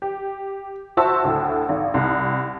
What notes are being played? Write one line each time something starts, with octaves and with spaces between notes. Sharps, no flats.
G4
F#4 C5 E5 A5 E6
D2 A2
G#1
C2